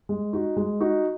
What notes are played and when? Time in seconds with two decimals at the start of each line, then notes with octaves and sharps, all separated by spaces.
0.09 G#3
0.33 D#4 F#4
0.57 G#3
0.81 D#4 F#4